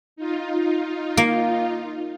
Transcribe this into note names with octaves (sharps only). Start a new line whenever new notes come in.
D#4 F4
A#3